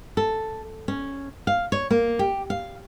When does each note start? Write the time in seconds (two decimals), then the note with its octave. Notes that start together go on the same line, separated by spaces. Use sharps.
0.17 A4
0.88 C#4
1.47 F5
1.72 C#5
1.91 A#3
2.19 G4
2.50 F5